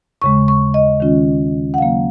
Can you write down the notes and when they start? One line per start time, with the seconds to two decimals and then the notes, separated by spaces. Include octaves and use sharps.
0.22 D#2 C#3 G#3 C#6
0.48 C#6
0.74 D#5
1.00 D#3 G#3 C#4 F4
1.74 F#5
1.78 C#3 F#3 A#3 F5